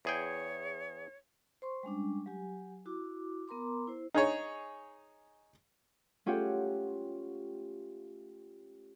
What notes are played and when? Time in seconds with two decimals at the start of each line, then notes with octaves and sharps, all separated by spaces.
0.05 E2 G#4 C#5 G5
1.62 C5 C6 C#6
1.83 G3 G#3 C#4 D4
2.26 F#3 G4 G#5
2.86 E4 F#4 D6
3.48 B3 A#4 A#5 C6 D6
3.88 E4 C5
4.14 D#4 G#4 C#5
6.26 A3 C#4 F4 G4 C#5 F#5